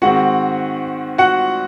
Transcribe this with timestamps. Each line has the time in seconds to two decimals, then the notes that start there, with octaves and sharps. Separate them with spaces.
0.02 G#2 D#3 G#3 C4 F#4 F#5
1.18 F#4 F#5